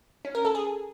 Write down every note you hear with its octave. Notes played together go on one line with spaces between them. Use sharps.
C#4
A#4
A4
G#4